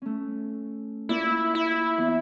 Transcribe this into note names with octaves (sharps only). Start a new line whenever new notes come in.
A3 C#4
A#3 E4 F4 D5
E4
E2